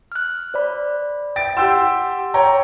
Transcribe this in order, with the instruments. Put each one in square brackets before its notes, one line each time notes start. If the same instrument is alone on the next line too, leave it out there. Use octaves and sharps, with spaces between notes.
[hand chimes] F6 F#6
C5 D5 B5
[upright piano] G5 A6 D7
[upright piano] G4 G5 E6 [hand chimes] F#5 C6
[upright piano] C#5 G5 A#5